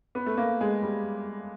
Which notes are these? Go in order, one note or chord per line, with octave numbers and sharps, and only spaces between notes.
B3
A3
A#3
G#3
G3